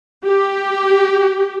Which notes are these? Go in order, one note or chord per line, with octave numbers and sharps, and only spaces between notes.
G4